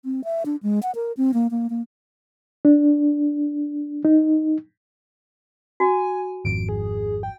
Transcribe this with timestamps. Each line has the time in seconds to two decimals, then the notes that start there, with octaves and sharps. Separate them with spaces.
0.05 C4
0.24 E5
0.46 D4
0.63 G#3
0.83 F#5
0.95 A#4
1.17 C4
1.34 A#3
1.51 A#3
1.70 A#3
2.65 D4
4.05 D#4
5.80 F#4 G#5
6.45 G#1 F2 D7
6.69 G#4
7.23 G5